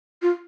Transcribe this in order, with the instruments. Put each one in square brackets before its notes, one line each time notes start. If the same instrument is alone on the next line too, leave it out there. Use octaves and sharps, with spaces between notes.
[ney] F4